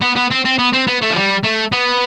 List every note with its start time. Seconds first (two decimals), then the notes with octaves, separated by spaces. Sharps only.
0.02 B3
0.16 B3
0.31 C4
0.45 C4
0.59 B3
0.73 C4
0.88 B3
1.02 A3
1.11 F3
1.16 G3
1.44 A3
1.72 B3